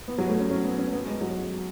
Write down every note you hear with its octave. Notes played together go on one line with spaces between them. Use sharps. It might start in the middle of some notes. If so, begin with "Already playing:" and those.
B3
F#3
A3
C#4
C#4
B3
C#4
B3
G#3
F#3